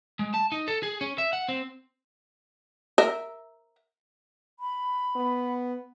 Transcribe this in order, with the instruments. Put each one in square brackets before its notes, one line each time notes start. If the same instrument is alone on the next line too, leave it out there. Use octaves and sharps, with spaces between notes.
[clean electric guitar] G#3
A5
D#4
A4
G#4
C#4
E5
F#5
C4
[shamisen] A#4 E5
[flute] B5
[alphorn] B3